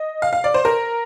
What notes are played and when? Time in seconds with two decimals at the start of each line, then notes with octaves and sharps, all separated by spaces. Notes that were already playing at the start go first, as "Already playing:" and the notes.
Already playing: D#5
0.22 F5
0.33 F5
0.44 D5
0.54 C5
0.65 A#4